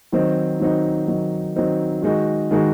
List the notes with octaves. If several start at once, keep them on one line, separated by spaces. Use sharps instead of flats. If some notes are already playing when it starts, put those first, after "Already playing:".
D#3 F#3 C4 D#4
D#3 F#3 C4 D#4
D#3 F#3 C4 D#4
D#3 F#3 C4 D#4
D#3 G#3 D#4 F#4
D#3 G#3 D#4 F#4